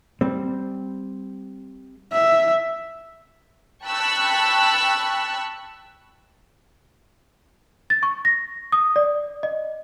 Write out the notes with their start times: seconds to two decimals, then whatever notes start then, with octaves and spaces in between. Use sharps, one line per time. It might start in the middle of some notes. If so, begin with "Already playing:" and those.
0.21 G3 C4
2.12 E5
3.84 G5 A5 B5 C#6 E6 F#6
7.90 A6
8.03 C#6
8.25 A#6
8.72 D#6
8.96 D5
9.43 D#5